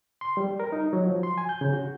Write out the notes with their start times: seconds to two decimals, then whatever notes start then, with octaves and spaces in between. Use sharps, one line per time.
0.21 C6
0.37 G3
0.60 A#4
0.72 D#4
0.93 F#3
1.07 F3
1.23 C6
1.38 G#5
1.49 G6
1.61 C#3
1.73 F#4